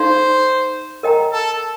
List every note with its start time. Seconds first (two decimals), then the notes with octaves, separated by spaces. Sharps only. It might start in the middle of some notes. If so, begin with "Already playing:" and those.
Already playing: D#4 A4 C5 D5 F5 C6
1.03 A#4 D#5 G5 A#5
1.32 A4